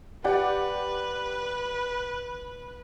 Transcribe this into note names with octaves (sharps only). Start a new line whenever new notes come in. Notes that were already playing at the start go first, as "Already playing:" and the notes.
G4 B4 D5 F#5